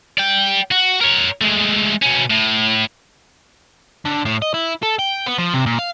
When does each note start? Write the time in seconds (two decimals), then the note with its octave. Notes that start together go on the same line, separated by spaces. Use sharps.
0.18 D5 G5
0.72 F#4
1.01 A#4 C#5
1.41 G#3 A3
2.02 B2 C#4
2.30 A2
4.05 D3
4.25 A2
4.42 D#5
4.54 E4
4.83 A4
4.99 G5
5.26 B3
5.38 F3
5.54 C3
5.66 A#2
5.79 F5